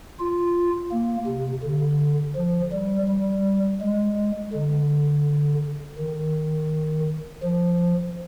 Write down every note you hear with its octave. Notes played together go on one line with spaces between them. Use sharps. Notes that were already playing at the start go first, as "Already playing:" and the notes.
F4
A#3
C3
D3
F3
G3
G3
G#3
D3
D#3
F3